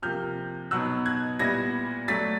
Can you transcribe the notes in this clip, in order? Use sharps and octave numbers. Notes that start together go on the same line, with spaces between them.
C3 F3 A#3 F6 G6
B2 F#3 B3 D#4 E6 F#6
F#6 G#6
A#2 G3 B3 E4 G#6 A#6
F#3 A3 D4 A6 B6